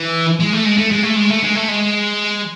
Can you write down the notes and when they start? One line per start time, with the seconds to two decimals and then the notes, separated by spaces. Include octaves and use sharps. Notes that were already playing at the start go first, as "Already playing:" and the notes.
Already playing: E3
0.40 G#3
0.53 A3
0.65 G#3
0.78 A3
0.92 G#3
1.03 A3
1.16 G#3
1.30 A3
1.43 G#3
1.55 A3
1.68 G#3